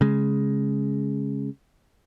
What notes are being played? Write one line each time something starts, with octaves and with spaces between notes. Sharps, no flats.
C#3 G#3